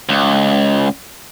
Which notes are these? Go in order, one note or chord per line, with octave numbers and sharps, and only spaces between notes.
C#2